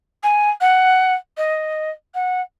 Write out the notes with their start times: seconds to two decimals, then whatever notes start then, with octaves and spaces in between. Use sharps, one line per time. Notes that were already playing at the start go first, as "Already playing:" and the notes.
0.23 G#5
0.60 F#5
1.37 D#5
2.14 F#5